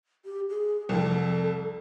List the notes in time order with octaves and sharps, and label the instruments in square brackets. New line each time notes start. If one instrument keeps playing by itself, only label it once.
[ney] G4
G#4
[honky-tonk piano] C2 F2 [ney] A4